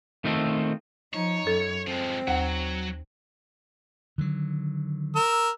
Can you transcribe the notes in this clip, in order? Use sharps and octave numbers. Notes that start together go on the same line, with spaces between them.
D#3 A3 C4 F4 G#4 A4
F3 D#4 C#5
F#2 A4
F3 G#3 C4
D#2 F#3 F#5
D3 D#3 F#3
A#4 E6